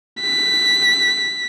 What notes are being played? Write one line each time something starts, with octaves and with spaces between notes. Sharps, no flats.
B6